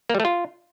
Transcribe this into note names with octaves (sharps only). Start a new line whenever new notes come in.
A#3
G3
A3
F4